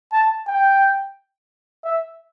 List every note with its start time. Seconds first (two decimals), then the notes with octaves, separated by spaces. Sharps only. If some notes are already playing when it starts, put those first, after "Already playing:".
0.13 A5
0.47 G5
1.84 E5